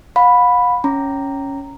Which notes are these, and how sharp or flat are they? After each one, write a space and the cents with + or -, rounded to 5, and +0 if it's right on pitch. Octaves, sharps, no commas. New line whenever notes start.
F5 +45 B5 +0
C#4 +0 A#5 -5